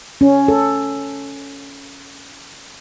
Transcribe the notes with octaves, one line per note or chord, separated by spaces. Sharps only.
C#4
A4